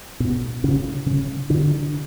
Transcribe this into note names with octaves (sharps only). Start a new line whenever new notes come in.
B2 B3
C#3 C#4
C#3 C#4
D3 D4